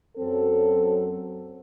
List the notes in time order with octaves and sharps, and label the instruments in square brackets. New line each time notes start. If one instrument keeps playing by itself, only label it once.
[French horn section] F#2 F#3 C4 A4